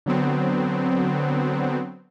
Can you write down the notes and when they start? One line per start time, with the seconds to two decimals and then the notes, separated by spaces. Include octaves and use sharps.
0.06 D3 F#3 B3 C4